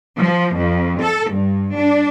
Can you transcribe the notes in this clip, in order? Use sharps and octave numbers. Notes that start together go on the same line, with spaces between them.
F3
F2
A4
G2
D4